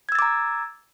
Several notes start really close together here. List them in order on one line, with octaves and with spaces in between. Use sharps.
G#6 E6 A6 D6 A#5